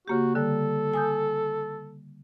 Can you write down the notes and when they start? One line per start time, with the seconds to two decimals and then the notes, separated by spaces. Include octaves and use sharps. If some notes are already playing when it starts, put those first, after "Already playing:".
0.08 C#3 A#3 F#4 G4
0.35 D3 G3 A4
0.94 G#5 D#6 G6